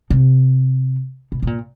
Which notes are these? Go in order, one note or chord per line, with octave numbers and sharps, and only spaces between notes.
C3
B2
B2
A#2